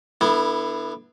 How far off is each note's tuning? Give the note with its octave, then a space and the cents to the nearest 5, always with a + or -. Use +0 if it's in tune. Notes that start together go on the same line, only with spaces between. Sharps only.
D3 +15 B3 -15 E4 +0